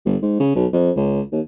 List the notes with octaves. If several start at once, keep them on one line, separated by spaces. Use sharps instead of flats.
G1
G#2
C#3
B1
F2
C#2
D#2